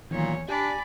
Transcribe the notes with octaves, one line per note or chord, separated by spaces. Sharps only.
E2 A#2 D#3 E3 F#3 C#5
D4 G4 D5 G#5 B5